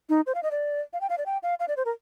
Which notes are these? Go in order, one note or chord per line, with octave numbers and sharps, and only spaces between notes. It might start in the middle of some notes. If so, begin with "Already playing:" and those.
D#4
C5
F5
D#5
D5
F5
G5
F5
D5
G5
F5
F5
D5
C5
A#4